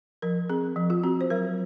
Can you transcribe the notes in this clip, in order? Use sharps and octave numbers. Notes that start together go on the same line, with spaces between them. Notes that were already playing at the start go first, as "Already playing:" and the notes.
F3 A#4
C4 G#4
F3
F4
C4 F#4
C5
F#3 A#4